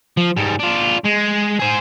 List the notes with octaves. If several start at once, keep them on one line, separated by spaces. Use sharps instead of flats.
F3
G#2 G3
D4 F4
G#3
G#4 C5